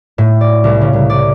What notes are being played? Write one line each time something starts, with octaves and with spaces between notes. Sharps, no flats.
A2
D5
C2
C#3
C2
D5